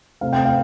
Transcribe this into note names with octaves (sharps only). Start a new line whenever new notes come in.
C3 A3 C4 F5
G5
F5